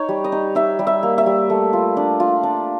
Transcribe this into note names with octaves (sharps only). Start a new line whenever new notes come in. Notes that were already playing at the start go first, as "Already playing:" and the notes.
Already playing: D#4 C#5
G3
D#5
D#4
D#4 E5
G3
E5
A#3
E5
G3
A3
F4
D4
F4
D4